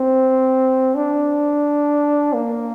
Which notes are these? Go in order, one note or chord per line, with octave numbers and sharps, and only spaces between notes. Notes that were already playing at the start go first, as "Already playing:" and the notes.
Already playing: C4
D4
A#3